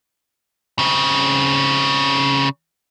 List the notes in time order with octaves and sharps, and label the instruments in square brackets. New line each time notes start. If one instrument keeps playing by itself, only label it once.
[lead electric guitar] C#3 C4